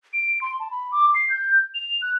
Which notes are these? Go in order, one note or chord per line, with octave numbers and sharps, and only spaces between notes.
D7
C6
A5
B5
D6
C7
G6
F7
F#6